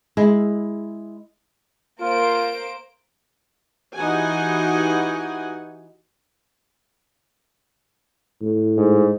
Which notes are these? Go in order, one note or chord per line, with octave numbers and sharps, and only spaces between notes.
G#3 E4
A#3 F4 C5 D7
E3 D#4 F#4 G4 F#5 G#5
A2
G#2